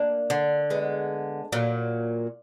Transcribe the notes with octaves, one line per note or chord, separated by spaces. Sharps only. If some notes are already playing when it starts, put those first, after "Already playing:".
Already playing: A#3 D4
D3
G#3 B3
A#2 F#3 A#3